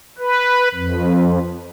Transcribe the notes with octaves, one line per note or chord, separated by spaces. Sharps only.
B4
F2